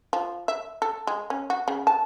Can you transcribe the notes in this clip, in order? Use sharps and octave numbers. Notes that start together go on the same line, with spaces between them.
F3
E5
A4
G#3
C#4
F#4
C#3
A5